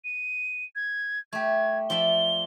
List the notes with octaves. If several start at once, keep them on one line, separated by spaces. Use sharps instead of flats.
D#7
G#6
A3 G4 G#6
F3 D5 E5 G7